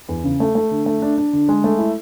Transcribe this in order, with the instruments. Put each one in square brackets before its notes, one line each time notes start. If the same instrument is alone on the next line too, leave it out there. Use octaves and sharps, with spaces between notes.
[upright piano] E2
C#3
A3
A3
D3
A3
D4
D4
D3
G#3
A3
E4